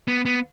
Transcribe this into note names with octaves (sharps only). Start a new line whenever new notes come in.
B3
B3